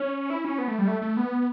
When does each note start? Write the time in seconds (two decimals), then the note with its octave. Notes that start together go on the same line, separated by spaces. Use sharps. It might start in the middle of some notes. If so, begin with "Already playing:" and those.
Already playing: C#4
0.30 E4
0.45 C#4
0.58 B3
0.68 A3
0.79 G3
0.88 A3
1.02 A3
1.17 B3